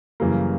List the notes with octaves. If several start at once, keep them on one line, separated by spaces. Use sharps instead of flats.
F#2 C#3 E3 G3 A#3